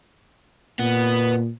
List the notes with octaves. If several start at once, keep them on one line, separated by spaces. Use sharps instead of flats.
A#2 B3